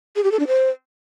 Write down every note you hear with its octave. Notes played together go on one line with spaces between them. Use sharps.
G#4
G4
A4
D4
C5